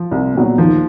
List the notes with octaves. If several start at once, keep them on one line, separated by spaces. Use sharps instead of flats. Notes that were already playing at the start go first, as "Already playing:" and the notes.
Already playing: F3
C2
A#2 F#3 B3
D#2 F3